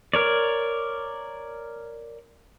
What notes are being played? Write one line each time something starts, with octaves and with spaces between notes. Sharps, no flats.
A#4 C#5 D5